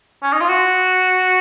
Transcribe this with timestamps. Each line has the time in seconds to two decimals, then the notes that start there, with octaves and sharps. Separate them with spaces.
0.23 C#4
0.33 D#4
0.41 F4
0.49 F#4